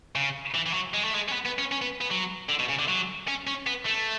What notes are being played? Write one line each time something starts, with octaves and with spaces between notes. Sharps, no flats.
C#3
E3
E3
F#3
G#3
A3
G#3
C#4
B3
B3
C#4
C#4
B3
B3
F#3
D3
B2
C#3
D3
F#3
C#4
C#4
B3
A3